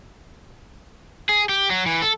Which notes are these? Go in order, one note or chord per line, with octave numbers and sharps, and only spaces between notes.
G#4
G4
F#3
E3
A4